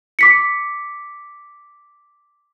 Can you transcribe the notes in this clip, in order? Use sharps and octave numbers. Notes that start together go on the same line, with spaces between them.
D6 B6 C#7